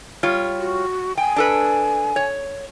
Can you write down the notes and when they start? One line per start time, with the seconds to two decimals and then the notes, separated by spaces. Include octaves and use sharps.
0.23 G3 F4 C#5
0.59 F#4
1.17 G5 G#5
1.36 D4 A4 B4
2.16 C#5